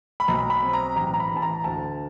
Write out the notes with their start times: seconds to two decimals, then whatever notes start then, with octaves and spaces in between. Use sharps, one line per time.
0.20 B5
0.28 B1 A#5
0.50 B5
0.63 C4
0.73 A#5
0.96 A1 A#5
1.14 A#5
1.20 B5
1.31 A1
1.37 A5
1.42 A#5
1.64 D2 A5